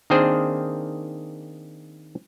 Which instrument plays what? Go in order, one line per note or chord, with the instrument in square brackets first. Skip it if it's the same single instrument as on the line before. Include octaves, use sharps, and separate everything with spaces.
[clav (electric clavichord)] D#3 A#3 C4 D4 G#4 C5